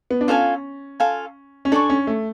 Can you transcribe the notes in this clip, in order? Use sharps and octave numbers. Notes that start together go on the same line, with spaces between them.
B3
D4
C#4 F4 A4 F5 G#5
F4 A4 F5 G#5
C#4
D4 A4 D5 G#5 C#6
C#4
A3